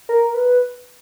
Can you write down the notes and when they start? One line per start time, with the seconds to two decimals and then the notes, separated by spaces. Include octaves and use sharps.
0.09 A#4
0.34 B4